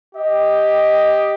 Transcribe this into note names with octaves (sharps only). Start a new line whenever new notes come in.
G4 D#5